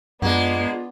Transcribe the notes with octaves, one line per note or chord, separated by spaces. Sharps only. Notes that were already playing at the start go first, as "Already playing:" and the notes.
F#2 G#3 A#3 B3 D4 F4